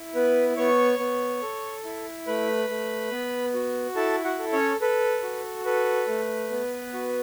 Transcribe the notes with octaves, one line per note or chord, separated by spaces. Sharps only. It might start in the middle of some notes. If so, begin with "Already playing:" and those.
Already playing: E4
B3 B4
B3 C#5 C#6
B3
A4
E4
A3 B4 B5
A3
B3
F#4
E4 A4 A5
F#4 F#5
A4
C#4 C#5
A4 B4
F#4
A4 B4
A3
B3
F#4